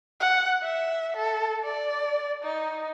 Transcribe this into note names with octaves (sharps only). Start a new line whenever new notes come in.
F#5
E5
A4
D5
D#4